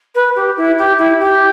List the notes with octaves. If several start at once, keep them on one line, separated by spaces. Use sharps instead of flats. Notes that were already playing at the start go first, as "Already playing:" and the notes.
B4
G4
E4
G4
E4
G4